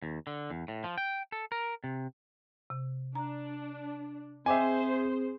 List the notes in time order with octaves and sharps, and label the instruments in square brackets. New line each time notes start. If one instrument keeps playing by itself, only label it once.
[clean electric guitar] D#2
D3
E2
A2
F3
G5
A4
A#4
C3
[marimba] C3
[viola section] D4 [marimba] A#5
[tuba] C4 [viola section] G#4 C5 [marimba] D#5 G5 D6 [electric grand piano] E5 G#5